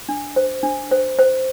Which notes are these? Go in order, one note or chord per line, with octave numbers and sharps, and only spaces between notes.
D4
C5
D4
C5
C5